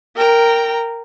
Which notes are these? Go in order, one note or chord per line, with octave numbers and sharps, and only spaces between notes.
A#4 G5 A#5